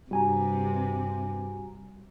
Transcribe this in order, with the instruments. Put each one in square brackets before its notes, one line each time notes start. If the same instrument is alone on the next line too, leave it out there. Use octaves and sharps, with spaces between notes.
[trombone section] G2 [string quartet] C3 [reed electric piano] G3 [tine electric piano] F#4 G#5 A#5